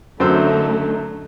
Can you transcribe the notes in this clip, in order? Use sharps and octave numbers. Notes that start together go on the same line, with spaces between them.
F#2 D3 A3 D#4 C5 E6